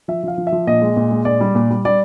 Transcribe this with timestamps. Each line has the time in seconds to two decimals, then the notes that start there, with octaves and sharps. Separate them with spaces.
0.08 F3 E5
0.23 F3 F5
0.38 F3
0.47 E5
0.52 F3
0.67 A#2 D#5
0.82 G#3
0.96 A#2
1.11 G#3
1.25 A#2 D5
1.41 G3
1.55 A#2
1.70 G3
1.85 G3 D5